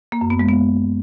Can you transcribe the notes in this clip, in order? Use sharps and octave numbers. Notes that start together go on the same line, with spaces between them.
A#3
F#2
B3
G#3
B3